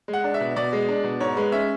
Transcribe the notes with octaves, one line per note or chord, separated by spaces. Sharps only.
G#3
F#5
D4
E5
B2
B2 D5
G#3
D4
B2
G#2 C#5
G#3 B4
C#4 E5